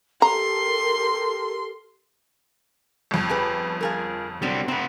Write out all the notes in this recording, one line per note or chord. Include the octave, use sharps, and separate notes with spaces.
G4 A4 A#4 A#5 C6
G1 F2
G4 G#4 B4
F4 G#4 A#4
D3 F#3 G3 C4
C3 G3 C4 F#5